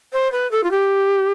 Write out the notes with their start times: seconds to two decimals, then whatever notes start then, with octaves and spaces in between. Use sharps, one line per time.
0.13 C5
0.32 B4
0.51 A4
0.63 F4
0.71 G4